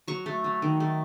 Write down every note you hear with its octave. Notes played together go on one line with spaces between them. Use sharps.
F#3 C#6
A3
F#3
D#3
A3